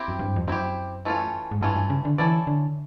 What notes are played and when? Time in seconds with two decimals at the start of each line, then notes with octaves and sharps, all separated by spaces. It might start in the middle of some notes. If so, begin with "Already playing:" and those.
Already playing: C4 E4 G4
0.08 F#2
0.19 G2
0.36 F2
0.47 F#2 C4 E4 G4
1.05 E3 A3 C#4 F4
1.51 G#2
1.61 G2 E3 A3 C#4 F4
1.76 G2
1.90 C#3
2.05 D3
2.18 E3 C#4 E4 A4 D5
2.47 D3